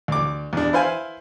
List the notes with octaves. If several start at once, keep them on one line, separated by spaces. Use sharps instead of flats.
D2 D6
E2 D4
E4 B4 C5 F5 G#5